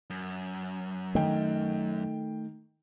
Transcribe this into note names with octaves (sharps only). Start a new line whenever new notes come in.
F#2
D#3 A3 G5